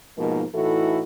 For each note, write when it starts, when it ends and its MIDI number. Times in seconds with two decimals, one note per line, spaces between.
0.18 0.44 44
0.18 0.44 47
0.18 0.44 53
0.18 0.44 58
0.18 0.44 63
0.18 0.44 70
0.54 1.02 45
0.54 1.02 52
0.54 1.02 63
0.54 1.02 64
0.54 1.02 66
0.54 1.02 69